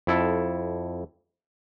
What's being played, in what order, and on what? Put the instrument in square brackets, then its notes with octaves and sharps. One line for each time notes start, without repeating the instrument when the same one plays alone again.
[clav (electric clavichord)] F2 E4 A4